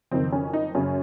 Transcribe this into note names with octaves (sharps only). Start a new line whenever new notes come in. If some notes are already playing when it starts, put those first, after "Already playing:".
F#1 F2 D#3 C4
C#4
D#4
F#1 F#2 C#3 C#4